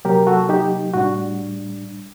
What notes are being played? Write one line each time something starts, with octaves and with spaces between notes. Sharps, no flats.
C3 F#3 A#3 G4 A#4
F#4 A4
D#4 G4
A2 G3 D4 F#4